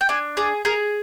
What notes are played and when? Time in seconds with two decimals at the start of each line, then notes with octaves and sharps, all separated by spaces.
0.01 G5
0.09 D4 G#5
0.37 G#4 D5
0.65 G#4 A#4